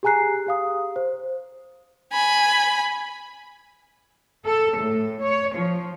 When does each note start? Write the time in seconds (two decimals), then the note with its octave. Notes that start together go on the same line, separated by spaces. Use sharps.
0.03 G4 G#4 G#5 A#5 F#6 C7
0.47 G4 F5 D#6
0.96 C5
2.12 G#5 B5
4.46 A4
4.78 A2
5.22 C#5
5.54 F3